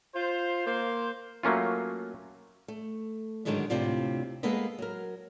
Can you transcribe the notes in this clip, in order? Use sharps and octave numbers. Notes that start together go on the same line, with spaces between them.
F4 C5
A#3 C5
F#3 A3 A#3 C#4 F4
A3
G#2 D3 D#3 F#3 G#3 A3
D2 A2 C3 F4 D5
G#3 A#3 B3 A4 B4 D#5
F#3 A#4